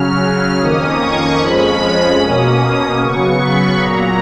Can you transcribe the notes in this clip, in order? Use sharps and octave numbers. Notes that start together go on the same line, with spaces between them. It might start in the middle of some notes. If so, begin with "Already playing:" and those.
Already playing: C#3 F#3 C#4 F6
F6
F2 D#3 A#3 C#4 D#6
C#6
F2 F3 G#3 C#4 B5
B2 A#3 C#4 D#6
C#3 F#3 B3 C#6
B5
A#2 F#3 A#3 A#5